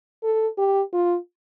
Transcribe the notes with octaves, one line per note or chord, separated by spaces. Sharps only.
A4
G4
F4